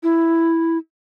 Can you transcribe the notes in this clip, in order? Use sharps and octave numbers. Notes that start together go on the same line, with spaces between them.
E4